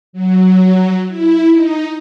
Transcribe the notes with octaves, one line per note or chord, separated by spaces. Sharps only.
F#3
E4
D#4